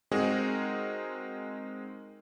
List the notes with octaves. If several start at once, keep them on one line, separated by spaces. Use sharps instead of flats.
G#3 C4 D#4 F#4 G#4 A#4